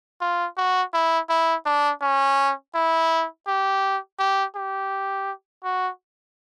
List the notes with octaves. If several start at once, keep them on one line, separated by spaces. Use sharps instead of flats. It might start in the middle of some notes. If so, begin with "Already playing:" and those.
F4
F#4
E4
E4
D4
C#4
E4
G4
G4
G4
F#4